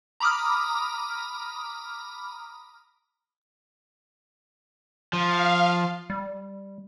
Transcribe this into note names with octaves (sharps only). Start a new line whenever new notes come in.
A#5 B5 D6 D#6 F6
F3 F5
G3